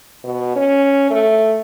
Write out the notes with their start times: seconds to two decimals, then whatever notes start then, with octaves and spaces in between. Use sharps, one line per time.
0.24 B2
0.56 C#4
1.10 A3